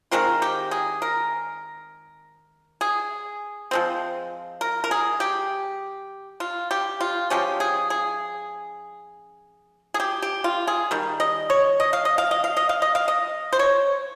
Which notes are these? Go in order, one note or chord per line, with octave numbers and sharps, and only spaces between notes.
D#3 G#3 C4 F4 A#4
G4
G#4
A#4
G#4
F3 G#3 C4
A#4
A#4
G#4
G4
F4
G4
F4
F3 G#3 C#4 G4
G#4
G#4
G#4
G4
G4
F4
G#4
D#3 G3
D#5
C#5
D#5
F5
D#5
F5
D#5
F5
D#5
F5
D#5
F5
D#5
C5
C#5